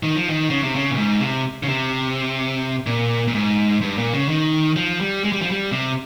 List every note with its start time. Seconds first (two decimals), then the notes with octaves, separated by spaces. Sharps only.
0.03 D#3
0.16 F3
0.29 D#3
0.50 C#3
0.63 C3
0.75 C#3
0.90 A#2
0.98 G#2
1.21 C3
1.63 C#3
1.69 C3
2.87 A#2
3.28 A#2
3.34 G#2
3.81 G2
3.98 A#2
4.14 C#3
4.29 D#3
4.76 F3
5.00 G3
5.24 G#3
5.32 G3
5.42 F3
5.51 G3
5.72 C3